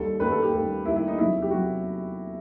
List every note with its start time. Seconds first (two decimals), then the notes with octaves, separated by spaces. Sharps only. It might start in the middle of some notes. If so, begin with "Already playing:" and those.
Already playing: D#2 D#3 G3 A4
0.19 D#2 D#3 G3 B4
0.31 A4
0.42 G4
0.53 D#2 D#3 G3
0.85 D#2 D#3 G3 E4
0.96 E4
1.07 D#4
1.18 E2 C3 F#3 E4
1.42 G4
1.50 C3 F#3 F#4